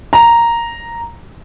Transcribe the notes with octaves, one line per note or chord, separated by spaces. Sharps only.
A#5